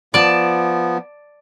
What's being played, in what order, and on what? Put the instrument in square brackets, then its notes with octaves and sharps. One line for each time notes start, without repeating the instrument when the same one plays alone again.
[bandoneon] F3 B3 [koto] D5 A5